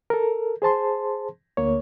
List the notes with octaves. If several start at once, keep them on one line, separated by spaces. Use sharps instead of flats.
A4 A#4
G#4 C5 A5 C6
D2 A#3 C#5